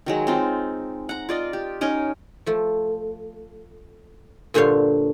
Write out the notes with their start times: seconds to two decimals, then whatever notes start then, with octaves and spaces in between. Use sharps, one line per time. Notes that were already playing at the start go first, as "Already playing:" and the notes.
0.06 D#3 F#3 G#3
0.27 C4 D#4 F4
1.09 F#5 A#5
1.29 F4 D5 D#5
1.53 G4
1.81 C#4 D#4 A#4 D#5
2.46 F3 A3
4.54 G2 A#2 D3 C5 C#5 F5